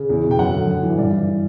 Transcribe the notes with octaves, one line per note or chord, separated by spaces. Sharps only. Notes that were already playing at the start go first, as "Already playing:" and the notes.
Already playing: C#3
E2
B2
G5
F#2 F#5
D3
F#2
E3
G2 D5
E3